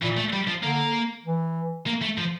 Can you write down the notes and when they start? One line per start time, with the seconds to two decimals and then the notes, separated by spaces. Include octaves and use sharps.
0.02 A#2 E3
0.17 A3
0.33 G3
0.48 F3
0.63 D3 A#3
1.25 E3
1.87 A#3
2.02 A3
2.18 F3